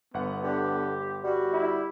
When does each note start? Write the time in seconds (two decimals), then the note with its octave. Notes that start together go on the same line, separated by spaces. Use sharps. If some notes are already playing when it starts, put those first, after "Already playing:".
0.14 G1 B3 F#5
0.43 D3 G4
1.24 G3 F#4
1.53 E4